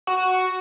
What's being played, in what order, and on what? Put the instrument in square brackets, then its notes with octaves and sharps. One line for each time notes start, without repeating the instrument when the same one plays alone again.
[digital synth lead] F#4